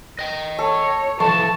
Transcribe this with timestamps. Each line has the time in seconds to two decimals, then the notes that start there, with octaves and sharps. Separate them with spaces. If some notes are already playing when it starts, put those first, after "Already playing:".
0.19 D#5 G5
0.59 A4 C#5
1.20 E3 F3 A4 A5 C#6